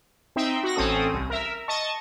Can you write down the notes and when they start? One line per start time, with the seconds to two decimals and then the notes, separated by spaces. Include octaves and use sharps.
0.36 C4 D#4 E5 G5
0.64 F#4 A#6
0.76 A1 C4 C#4 A4 D#6
1.14 C2
1.30 A#4 E5
1.68 D#5 A5 C#6